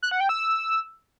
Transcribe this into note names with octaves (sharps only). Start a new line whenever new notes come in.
F#6
F#5
G5
E6